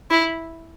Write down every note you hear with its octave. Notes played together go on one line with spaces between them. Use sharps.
E4